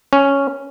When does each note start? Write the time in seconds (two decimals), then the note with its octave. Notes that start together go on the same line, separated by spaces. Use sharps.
0.13 C#4